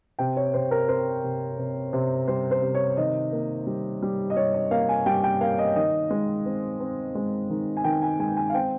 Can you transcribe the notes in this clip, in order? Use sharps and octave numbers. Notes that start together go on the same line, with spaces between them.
C3 G5
C#5
C3 C5
A#4
C4 C5
C3
C3
C3
G3 C5
C5
C3
C#5
D#3 D#5
A#3
G3
G3
D#5
G3 C#5
D#5
A#3 F5
G#5
G3 G5
G5
A#3 F5
D#5
D#3 D#5
G#3
C4
C4
G#3
D#3
G#5
D#3 G5
G#5
G#3 G#5
G#5
F5
C4 G5